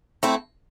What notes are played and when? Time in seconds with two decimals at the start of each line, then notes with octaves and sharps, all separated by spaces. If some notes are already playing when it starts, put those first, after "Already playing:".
0.23 A3 C4 E4